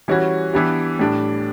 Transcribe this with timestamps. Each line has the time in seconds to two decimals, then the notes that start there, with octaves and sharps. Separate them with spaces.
0.08 E3 G3 C#4 F#4
0.54 E3 B3 D4 G4
0.99 A2 G3 D4